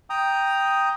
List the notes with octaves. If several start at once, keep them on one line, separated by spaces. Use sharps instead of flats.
G5 A#5 D#6